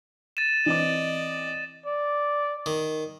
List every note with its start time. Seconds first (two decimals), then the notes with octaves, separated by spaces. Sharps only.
0.37 A6 D#7 E7
0.66 E3 C4 D5 D#5 D6
1.86 D5
2.66 D#3